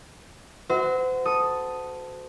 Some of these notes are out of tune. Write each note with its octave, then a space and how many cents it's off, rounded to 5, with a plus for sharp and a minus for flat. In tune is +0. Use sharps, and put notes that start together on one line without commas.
F#4 +5 C5 -35 E5 -35
A4 +0 D#6 +0